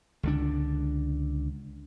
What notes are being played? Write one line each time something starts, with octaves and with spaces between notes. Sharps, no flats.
C#2 D3 D4